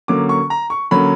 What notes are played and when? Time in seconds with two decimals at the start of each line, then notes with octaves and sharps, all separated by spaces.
0.08 D3 F#3 A#3 C#4 D6
0.29 C#6
0.50 A#5
0.70 C#6
0.91 D3 F#3 A#3 C#4 B5